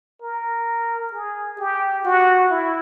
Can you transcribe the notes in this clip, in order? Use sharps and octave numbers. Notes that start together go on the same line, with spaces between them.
A#4
G#4
G4
F#4
E4